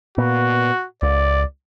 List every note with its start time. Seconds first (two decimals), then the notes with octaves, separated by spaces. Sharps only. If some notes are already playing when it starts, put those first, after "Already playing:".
0.18 A#2 B3 F#4
1.02 C#2 D5